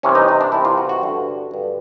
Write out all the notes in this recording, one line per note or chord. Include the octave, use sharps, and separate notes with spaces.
C2 C3 E3 C#4
D#4
D#4
D4
C2 C3 E3 E4
F4
F#4
F#4
G2 D3
G2 D3